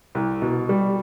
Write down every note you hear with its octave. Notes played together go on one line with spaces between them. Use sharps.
C2
B2
G3